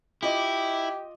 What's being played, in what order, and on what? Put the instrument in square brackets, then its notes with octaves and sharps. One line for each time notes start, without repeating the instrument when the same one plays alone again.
[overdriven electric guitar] E4 [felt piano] F4 D#5 D6 [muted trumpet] G4